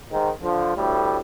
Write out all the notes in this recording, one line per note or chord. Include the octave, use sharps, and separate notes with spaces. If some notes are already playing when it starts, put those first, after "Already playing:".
G#2 D#3
D3 F3
D2 A2 G3